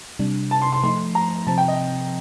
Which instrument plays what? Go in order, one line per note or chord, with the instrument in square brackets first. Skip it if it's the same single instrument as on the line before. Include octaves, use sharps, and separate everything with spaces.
[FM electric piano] C3 G3 D4
[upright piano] A5
C6
C6
[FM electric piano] F3 A3 D#4 [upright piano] C6
[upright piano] A#5
[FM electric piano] C3 F3 C4 [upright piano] A5
[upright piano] G5
D#5